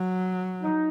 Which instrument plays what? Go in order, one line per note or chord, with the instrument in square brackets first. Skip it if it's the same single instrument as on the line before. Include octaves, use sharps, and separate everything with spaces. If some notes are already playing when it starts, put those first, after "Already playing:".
Already playing: [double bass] F#3
[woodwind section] D#4